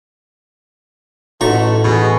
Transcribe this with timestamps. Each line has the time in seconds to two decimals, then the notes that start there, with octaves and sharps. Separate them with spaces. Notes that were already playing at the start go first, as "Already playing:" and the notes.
1.41 A1 A3 D#4 F#4 A#5 C#6
1.84 B2 E3 G#4